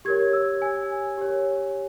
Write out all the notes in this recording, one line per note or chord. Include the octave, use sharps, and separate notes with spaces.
G4 A#4 C#5 G#6
E6
G#5
G4 C#5